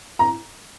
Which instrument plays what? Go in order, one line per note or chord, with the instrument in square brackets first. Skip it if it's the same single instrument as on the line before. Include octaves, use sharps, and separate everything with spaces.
[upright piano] A#5